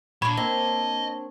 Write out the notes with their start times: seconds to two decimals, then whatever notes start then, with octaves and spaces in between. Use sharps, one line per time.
0.22 A#2 D4 C#5 B5
0.37 A#3 C4 D#5